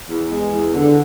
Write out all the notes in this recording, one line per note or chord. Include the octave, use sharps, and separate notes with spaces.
E2
G#3
E2
D3